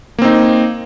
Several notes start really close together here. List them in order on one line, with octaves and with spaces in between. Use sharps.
A#3 C4 D#4